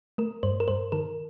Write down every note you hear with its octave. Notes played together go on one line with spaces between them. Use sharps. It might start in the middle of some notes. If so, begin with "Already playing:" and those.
A3 A#4
G2 C5
A#4
G2 C5
D#3 A#4